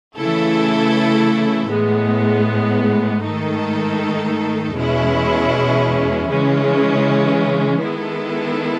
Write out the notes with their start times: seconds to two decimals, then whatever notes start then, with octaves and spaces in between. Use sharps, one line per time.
0.16 C#3 E3 A3 E4 A4
1.69 A2 G#3 B3
3.22 G#2 D#3 A3 D#4 A4
4.75 E2 B2 G#3 C#4 E4
6.27 C#3 E3 G#3 C#4
7.81 D#3 G#3 B3 E4 A4